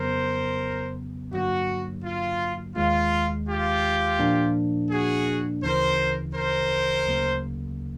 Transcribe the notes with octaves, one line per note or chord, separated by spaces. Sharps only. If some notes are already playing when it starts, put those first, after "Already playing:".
Already playing: F2 C#3 F#3 B3 A#4 C5
G2 D3 F#3 A#3 F#4
F4
D#2 D#3 G#3 F4
F4 G4
A#2 F3 A#3 D4
F#4 G#4
D2 C#3 E3 A#4 C5
A#4 C5
D2 C#3 F#3 A#3